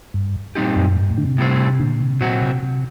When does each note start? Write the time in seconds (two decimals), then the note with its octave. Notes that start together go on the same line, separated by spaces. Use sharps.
0.14 G2
0.55 A#2 G3 C4 D#4 G4
0.76 F#2
0.97 G2
1.11 A2
1.18 D3
1.24 C3
1.38 A2 G3 C4
1.80 A#2 D3
2.01 C3
2.21 A#2 F#3 C4 F#4
2.42 C3
2.63 C3